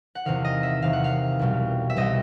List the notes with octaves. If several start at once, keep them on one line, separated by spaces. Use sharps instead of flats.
F#5
E2 C3 D#3 F5
D#5
E5
E2 C3 D#3 F5
F#5
F5
C2 B2 G3
E5
C2 B2 G3 D#5